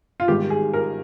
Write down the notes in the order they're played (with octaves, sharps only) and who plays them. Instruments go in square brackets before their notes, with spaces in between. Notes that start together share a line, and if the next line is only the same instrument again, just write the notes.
[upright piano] F4
G#1 G#2 D#3 G3 G4
G#4
A#4